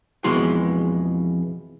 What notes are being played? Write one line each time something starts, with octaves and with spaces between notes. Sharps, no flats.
F2 B2 E3 G#3 C6